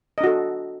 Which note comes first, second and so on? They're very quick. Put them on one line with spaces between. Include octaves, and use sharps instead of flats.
D#5 D4 F#4 A4